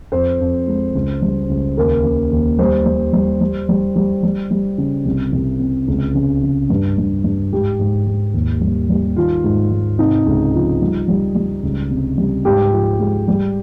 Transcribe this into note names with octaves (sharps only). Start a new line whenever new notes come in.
F2 C5
F2
G#3
C#2
G3
C#2
D#2 A#4
C#3
D#2
G3 C5
G3
G3
G3
G3
G3
G3
G3
C#3
C2
C2
C3
C#2
C#3
C#3
G2
G2
G2
G#2 G4
G#2
G#2
D#2
G3
G3
D#3 F4
G#2
G#2
C3 D#4
C#2
F3
G3
G3
G3
C#2
C3
G3
G#2 G4
F3
G#3
G3